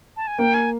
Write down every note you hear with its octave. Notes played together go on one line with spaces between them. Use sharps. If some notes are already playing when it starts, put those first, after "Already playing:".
A5
G#5
A#3 G5
G#5